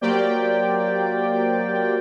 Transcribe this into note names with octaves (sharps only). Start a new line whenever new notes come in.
F#3 A#3 G4 C5 D5 G5